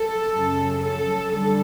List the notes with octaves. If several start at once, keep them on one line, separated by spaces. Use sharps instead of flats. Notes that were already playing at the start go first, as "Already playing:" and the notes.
Already playing: A4
F#2 C#3 F#3
A4
D3 G3 A4